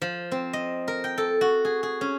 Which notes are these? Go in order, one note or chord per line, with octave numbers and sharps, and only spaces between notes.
F3
C4
D#5
A#4
G5
A4
F#4
G#4
G#4
C#4